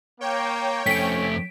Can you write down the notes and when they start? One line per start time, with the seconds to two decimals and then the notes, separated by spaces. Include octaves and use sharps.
0.21 A#3 C#5 G5
0.86 F2 A3 C#4 B6 D7